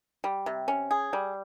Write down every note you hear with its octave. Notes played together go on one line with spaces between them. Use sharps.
G3
C3
C#4
G#4
G3